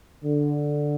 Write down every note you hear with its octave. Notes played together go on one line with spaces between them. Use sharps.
D3